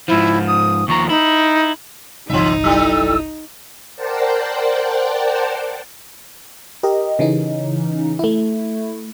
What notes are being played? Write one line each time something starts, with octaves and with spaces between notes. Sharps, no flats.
G#2 F3 E4
D#6
D#2 F3 A#5 C#6
D#4 E4
G1 C2 E3 D#4 E5
F#3 G3 A3 E4 E6
A#4 C5 D5 F#5 G5 A5
G4 A#4 D#5
C#3 E3 C#4 D#4
A3 E4